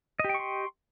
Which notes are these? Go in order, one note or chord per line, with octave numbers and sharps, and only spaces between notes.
G4 D#5 G5 C6 C#6